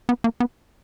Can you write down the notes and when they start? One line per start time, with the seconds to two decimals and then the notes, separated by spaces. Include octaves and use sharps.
0.09 B3
0.24 A#3
0.40 B3